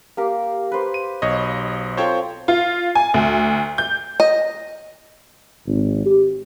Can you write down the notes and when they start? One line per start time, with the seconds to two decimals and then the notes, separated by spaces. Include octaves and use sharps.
0.17 A#3 G4 A#4
0.72 B4 C5
0.94 D#7
1.22 B1 C#5 D#5
1.97 C4 F4 A4 C5 C#5 G5
2.48 F4
2.95 G#5
3.14 D2
3.78 G6
4.20 D#5
5.67 G#1
6.05 G4